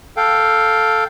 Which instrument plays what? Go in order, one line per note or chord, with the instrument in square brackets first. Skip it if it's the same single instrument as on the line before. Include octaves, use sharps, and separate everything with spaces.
[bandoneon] A4 F5 G5